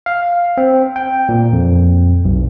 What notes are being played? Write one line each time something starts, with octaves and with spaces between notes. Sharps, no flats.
F5
C4
G5
A#2
F2
B1